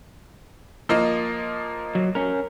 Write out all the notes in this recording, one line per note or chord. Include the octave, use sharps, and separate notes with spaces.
F3 A#3 D#5
F#3
C#4 A#4